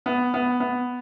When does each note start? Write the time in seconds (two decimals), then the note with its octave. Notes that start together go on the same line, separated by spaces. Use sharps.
0.06 B3
0.34 B3
0.60 B3